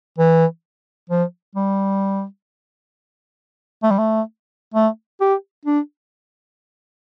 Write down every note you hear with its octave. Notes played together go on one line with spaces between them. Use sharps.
E3
F3
G3
A3
G3
A3
A3
G4
D4